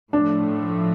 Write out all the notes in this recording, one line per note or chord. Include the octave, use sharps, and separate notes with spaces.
A2 F3 A3 D4